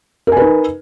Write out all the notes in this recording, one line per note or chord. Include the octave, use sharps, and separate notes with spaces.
D#4 A#4 B4 G#5